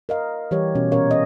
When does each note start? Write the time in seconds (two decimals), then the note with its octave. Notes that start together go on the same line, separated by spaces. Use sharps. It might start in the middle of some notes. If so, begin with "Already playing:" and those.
0.09 A#4 D#5 F5
0.51 E3 G3 G4 A#4 C#5
0.75 B2 C#4
0.92 A#2 C#4 A#4 C#5 F5
1.11 C#5 D#5